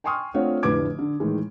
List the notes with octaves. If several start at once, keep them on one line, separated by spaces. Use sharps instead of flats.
G5 G#5 C6 C#6 D#6 F6
A3 C4 D4 F4 C#5 F#5
F1 A2 D3 B4 D6 G#6
D3
A2 D#3 E3 G#3